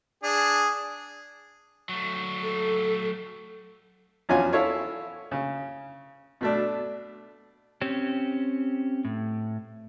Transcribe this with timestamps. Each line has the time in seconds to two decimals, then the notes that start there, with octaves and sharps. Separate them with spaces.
0.23 D4 G#4
1.89 F#3 A3
2.42 A4
4.29 E2 F3 C#4 F4 F#4 G#5
4.52 E4 A4 C#5 F5
5.31 C#3
6.41 B2 A3 D4
7.81 C4 C#4 G4
9.05 A2